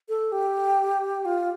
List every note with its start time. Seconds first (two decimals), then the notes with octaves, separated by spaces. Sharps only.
0.09 A4
0.32 G4
1.25 F4